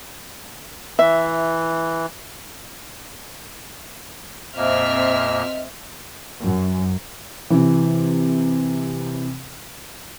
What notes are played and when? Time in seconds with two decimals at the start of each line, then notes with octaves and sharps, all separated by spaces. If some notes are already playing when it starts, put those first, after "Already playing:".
0.99 E3 E5
4.57 F2 A#2 A#3 C4 D#5 E5 F6
6.43 F#2
7.50 C3 E3